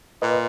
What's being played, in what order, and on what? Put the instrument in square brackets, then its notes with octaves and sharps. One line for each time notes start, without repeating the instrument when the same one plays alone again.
[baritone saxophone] A#2 [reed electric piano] B4 D#5